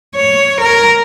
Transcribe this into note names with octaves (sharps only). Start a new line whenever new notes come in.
C#5
A#4